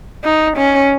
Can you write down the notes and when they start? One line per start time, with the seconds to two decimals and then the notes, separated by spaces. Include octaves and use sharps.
0.24 D#4
0.57 C#4